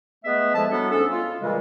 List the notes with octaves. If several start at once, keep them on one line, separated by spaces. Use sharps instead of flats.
G#3 A3 B3 B4 E5
A2 F3 G#3 E5 A5
F#3 G3 B3 D4 A4
G#2 C#4 A4
F4
A#2 C#3 E3 G3 G#3